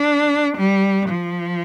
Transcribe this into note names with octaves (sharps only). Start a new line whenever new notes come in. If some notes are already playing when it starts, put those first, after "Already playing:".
Already playing: D4
G3
F3